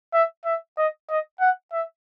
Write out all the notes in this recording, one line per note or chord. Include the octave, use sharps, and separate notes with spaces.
E5
E5
D#5
D#5
F#5
E5